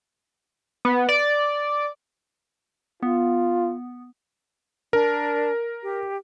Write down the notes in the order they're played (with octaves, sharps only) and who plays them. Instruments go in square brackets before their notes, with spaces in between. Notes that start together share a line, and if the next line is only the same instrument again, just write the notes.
[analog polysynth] B3
D5
[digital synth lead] B3 [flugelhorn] F4
[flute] D4 [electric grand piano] A#4
[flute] G4